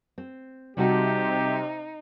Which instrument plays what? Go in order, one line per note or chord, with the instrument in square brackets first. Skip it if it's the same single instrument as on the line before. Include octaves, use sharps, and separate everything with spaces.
[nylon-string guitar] C4
[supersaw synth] C3 [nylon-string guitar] G3 F#4 A4 [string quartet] D#4 [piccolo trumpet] G4